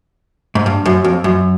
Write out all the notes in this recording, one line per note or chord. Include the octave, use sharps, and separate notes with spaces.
G#2
G2
F#2
F2
F#2